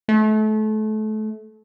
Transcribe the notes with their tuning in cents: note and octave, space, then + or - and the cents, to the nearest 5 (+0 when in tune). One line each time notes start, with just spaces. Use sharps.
A3 -30